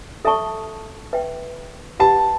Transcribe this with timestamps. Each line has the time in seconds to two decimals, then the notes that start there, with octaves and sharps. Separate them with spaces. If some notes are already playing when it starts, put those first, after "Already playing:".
0.25 A4 E5 A5 C#6
1.13 B4 E5 G5
1.99 G4 B4 F#5 A5 B5